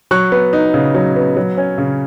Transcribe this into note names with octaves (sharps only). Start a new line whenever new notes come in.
F#3 C#6 F#6
B3
D#4
C#3
F#3
B3
F#3
C#4
C#3